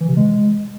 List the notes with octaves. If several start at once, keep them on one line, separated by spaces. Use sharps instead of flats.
E3
C3
G#3